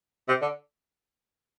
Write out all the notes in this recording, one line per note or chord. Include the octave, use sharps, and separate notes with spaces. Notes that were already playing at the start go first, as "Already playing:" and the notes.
C3
D3